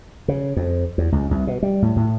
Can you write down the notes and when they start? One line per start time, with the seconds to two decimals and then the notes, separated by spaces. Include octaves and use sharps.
0.28 C#3
0.57 F2
0.98 E2
1.12 C#2
1.31 C2
1.47 B2
1.63 G3
1.82 A2
1.96 A2